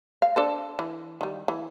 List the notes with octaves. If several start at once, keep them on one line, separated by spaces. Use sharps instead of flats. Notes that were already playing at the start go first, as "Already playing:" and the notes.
F5
D4 A4 C5
E3
D#3 G3
E3